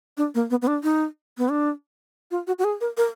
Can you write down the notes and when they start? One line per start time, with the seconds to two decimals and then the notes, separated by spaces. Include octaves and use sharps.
0.17 D4
0.35 A#3
0.50 B3
0.62 B3
0.67 D4
0.83 D#4
1.38 B3
1.49 D4
2.31 F4
2.47 F#4
2.59 F#4
2.64 G#4
2.81 A#4
2.97 A#4